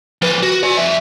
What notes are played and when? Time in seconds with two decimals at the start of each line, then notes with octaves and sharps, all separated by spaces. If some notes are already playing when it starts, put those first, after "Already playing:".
0.22 F3 B4
0.43 F#4
0.63 D5 G#5
0.77 F2 E5